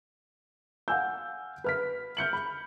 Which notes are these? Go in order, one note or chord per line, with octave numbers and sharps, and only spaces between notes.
F5 F#5 G#5 E6 G6
B4 F6 B6
F6 G6 C#7 F#7
B5